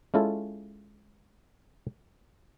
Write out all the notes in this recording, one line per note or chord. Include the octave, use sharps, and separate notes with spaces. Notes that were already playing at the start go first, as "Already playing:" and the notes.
G#3 C#4 E4 F4 A4